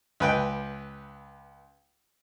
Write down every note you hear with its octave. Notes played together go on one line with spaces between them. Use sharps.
C#2 B4 G5